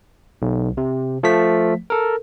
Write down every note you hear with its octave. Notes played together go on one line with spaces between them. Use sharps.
B1
C3
F3 A3 B6
A4 A#4